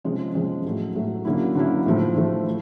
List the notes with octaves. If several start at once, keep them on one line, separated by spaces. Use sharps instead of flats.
C3 F3 G#3 C#4
C3 F3 G#3 C#4
A2 F#3 A3
A2 F#3 A3
D3 F#3 A#3 C#4 E4
D3 F#3 A#3 C#4 E4
A2 F3 A3
A2 F3 A3
E4